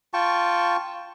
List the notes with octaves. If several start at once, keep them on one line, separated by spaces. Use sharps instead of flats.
F4 G5 A5 C#6